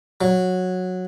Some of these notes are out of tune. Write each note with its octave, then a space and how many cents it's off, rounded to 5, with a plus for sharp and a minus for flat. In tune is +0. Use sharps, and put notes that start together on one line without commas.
F#3 -10